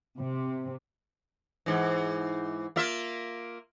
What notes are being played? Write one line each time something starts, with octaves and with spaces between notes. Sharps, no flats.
C3
G#2 E3
A#3 F4 E5